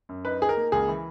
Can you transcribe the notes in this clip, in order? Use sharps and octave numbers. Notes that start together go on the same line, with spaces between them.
F#2
D#4 B4
D#4 G#4
A#4
A#3
C#2 G#4
E3